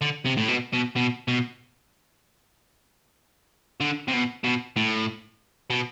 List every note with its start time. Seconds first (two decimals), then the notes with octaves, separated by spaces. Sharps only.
0.01 D3
0.25 C3
0.37 A2
0.48 B2
0.73 B2
0.96 B2
1.28 B2
3.80 D3
4.08 C3
4.13 B2
4.44 B2
4.76 A2
5.70 B2